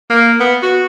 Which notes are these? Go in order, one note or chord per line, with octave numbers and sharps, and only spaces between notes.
A#3
B3
F#4